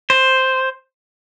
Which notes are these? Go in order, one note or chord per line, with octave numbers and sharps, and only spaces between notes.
C5